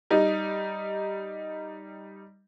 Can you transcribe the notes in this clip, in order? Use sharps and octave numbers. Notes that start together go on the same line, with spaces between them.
G3 D#4